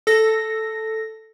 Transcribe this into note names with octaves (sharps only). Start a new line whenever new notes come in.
A4 A#6